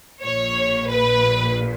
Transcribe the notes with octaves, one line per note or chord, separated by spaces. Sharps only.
A#1 A#2 C#5
B4